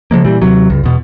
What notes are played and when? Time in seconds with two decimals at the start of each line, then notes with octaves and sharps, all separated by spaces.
0.11 C#3 F3 G#3 A#3
0.24 A#2 E3 G3
0.42 D#2 C3 F#3
0.70 C#2 G2
0.83 E2 B2